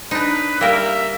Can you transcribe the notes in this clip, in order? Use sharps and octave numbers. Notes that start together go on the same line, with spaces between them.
D4 D#4 B4
G3 A#3 A#4 E5